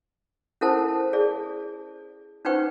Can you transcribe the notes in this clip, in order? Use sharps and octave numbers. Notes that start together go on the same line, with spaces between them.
C#4 E4 A4 A#4 C5 A5
G#4 D5
C#4 D#4 B4 C5 G5 C#6